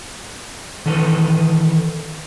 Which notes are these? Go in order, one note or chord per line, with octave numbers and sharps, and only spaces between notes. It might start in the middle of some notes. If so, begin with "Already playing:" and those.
D#3 E3 A4 B4